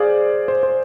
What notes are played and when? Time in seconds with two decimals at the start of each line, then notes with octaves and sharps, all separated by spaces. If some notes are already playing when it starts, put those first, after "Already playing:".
Already playing: G#4 C5 D5 F5
0.48 C5
0.63 C5